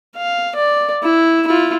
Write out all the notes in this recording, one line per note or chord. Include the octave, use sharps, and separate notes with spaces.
F5
D5
E4
E4 F4